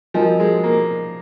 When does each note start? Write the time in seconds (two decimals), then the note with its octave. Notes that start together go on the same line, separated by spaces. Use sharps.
0.14 F3 F#4 A#4 D#5 G#5
0.40 G#3
0.63 A#3